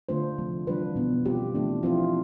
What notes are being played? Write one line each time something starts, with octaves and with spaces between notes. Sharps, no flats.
D3 A3 D4 F4 C5
C3 F3 A3
C3 E3 G3 D4 F4 B4
B2 B3 D4 F4
G3 C4 F4 G4
E3 A3 D4
F3 C4 E4 F4